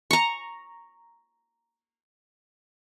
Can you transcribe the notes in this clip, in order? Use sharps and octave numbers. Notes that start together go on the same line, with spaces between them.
A#5 C#6